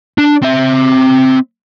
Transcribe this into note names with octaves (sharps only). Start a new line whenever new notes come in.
D4
C4 E5